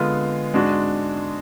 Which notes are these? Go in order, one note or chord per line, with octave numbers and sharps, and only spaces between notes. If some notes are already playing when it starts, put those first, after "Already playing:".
Already playing: D3 G#3 B3 F4
G#2 G#3 D4 F#4